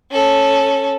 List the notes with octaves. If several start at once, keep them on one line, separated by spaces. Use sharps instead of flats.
C#4 A4